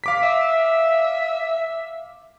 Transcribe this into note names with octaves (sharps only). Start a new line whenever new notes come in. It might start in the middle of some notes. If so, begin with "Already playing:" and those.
F5 D6 B6
E5